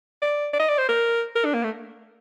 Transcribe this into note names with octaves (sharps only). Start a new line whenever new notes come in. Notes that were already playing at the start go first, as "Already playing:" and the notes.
D5
D5
D#5
D5
C5
A#4
A#4
D4
A#3
A3